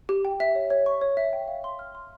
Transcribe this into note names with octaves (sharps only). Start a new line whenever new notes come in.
G4
G5
E5
C#5
C#5
C#6
C#5
E5
G5
F5
C6
F6
C6